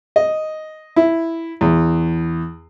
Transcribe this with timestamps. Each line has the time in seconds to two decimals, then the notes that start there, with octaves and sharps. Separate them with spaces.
0.16 D#5
0.96 E4
1.61 E2